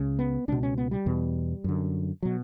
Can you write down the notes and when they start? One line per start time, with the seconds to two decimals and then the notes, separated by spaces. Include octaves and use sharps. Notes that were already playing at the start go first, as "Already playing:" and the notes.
Already playing: C#2 C#3
0.19 B3
0.48 C#2 B2 D4
0.63 C#4
0.78 B3
0.91 G3
1.06 E2 B2
1.64 F#2 D3
2.23 B2 F#3